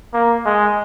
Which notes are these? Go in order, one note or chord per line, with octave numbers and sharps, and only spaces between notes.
A#3
G#3